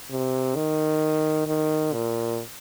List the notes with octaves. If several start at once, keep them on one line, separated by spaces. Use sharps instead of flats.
C3
D#3
D#3
A#2